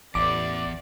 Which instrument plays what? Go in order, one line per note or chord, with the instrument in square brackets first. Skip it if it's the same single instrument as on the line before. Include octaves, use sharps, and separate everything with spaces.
[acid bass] A1 [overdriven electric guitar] E2 [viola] D5 [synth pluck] D6